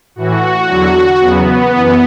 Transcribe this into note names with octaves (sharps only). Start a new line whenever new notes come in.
A2 E3 F#4
E2 D3 F#3
E2 C#3 F#3 B3
F#2 E3